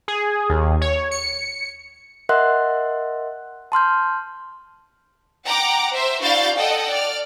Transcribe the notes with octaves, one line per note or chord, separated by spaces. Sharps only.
G#4
D#2
C#5
C#7
A#4 D#5 E5 F#5 C6 F#6
A5 C6 F6 G6
F#5 G5 A#5 D6
C5 E5
D4 E4 F#4 F5 G6 A6
A4 D#5 F#5 G5
D5 F6